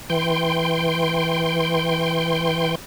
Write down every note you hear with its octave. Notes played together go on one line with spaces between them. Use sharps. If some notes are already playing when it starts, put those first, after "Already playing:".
E3 G5 C6